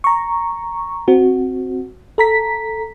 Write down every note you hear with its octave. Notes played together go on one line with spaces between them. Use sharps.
A#5 C#6
C4 F#4
A4 A#5 B6